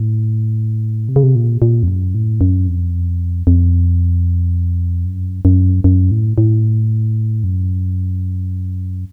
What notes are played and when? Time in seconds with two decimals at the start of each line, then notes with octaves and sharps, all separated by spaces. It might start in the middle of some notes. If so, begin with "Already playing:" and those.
Already playing: A2
1.09 C3
1.16 C#3
1.23 C3
1.35 A#2
1.62 A#2
1.83 F2
1.88 F#2
2.15 A2
2.41 F#2
2.67 F2
3.47 F2
5.05 F#2
5.45 F#2
5.84 F#2
6.11 A2
6.38 A2
7.44 F#2